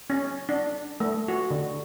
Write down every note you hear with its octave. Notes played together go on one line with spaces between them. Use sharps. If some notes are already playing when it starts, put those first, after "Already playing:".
C#4
D4
A3
F#4
D3